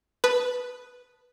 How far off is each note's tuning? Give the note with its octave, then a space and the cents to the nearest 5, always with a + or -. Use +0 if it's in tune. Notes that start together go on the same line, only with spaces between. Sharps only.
B4 +0 A5 +0 D#6 +0